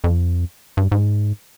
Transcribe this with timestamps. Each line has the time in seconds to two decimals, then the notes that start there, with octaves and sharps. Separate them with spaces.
0.04 F2
0.77 G2
0.92 G#2